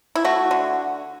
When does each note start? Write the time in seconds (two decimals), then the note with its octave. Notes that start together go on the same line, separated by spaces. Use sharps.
0.16 E4
0.25 A3 F#4
0.51 D3